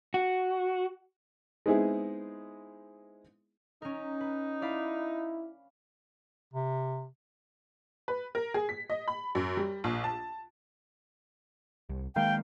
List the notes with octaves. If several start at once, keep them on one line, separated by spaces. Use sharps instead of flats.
F#4
G#3 B3 C4 D#4 E4 G#4
C#4 D#4 A#4
B4
E4 D5 F5 B5
C3
B4
A#4
G#4
B6
D#5
B5
F#2
G3
A#1
A5
C2
D#3 G#3 A#3 F5 G5